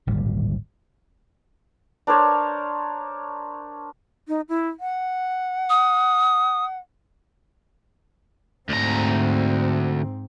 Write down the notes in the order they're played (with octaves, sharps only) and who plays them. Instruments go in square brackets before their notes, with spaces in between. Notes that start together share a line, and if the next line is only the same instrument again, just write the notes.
[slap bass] D1 G#1 A#2 G3
[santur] D4 A#4 C5 C#5
[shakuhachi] D#4
E4
F#5
[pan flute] D#6
[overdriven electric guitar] D2 A#5 [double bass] G#2 C4